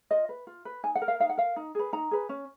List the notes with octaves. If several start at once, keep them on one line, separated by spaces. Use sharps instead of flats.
F4 D#5
B4
F4
B4
D#4 G#5
F#5
A#4
F5
D#4 F5
F#5
A#4 F5
D#4
G#4 B4
D#4 A#5
G#4 B4
C#4